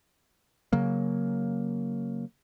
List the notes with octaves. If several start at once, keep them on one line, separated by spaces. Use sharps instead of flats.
C#3 F#3 A#3